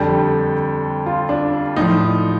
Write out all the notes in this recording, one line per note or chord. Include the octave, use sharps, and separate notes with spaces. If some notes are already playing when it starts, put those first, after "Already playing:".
Already playing: F2 D3 G3 A4
F4
D4
A2 F3 D#4